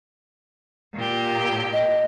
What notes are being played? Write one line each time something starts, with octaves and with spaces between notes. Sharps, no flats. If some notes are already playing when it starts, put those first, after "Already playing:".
A#2 G4
D#5